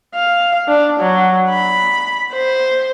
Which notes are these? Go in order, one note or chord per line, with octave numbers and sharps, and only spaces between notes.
F5
D4
F#3
B5
C5